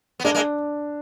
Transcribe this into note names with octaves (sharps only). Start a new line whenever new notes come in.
B3
G#3 A#3 D4
G#3 A#3